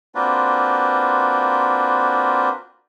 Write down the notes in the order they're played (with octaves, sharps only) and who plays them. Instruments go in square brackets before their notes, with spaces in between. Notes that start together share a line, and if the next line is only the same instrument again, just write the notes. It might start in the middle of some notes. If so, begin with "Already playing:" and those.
[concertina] A#3 C4 D4 F4 F#4 B4